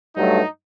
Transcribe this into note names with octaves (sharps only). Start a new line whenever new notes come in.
G2 F#3 A3 D#4